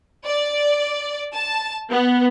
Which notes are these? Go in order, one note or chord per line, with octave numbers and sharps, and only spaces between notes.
D5
A5
B3